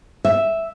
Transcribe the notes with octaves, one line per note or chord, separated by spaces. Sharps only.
E5